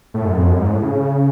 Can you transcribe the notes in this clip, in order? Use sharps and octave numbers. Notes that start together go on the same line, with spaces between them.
A2
F#2
F2
F#2
G#2
A2
C#3